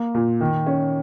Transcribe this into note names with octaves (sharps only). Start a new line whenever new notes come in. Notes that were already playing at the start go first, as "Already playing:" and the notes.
Already playing: A#3
A#2
D#3
C#4